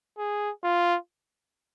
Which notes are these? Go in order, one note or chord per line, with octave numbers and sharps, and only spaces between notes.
G#4
F4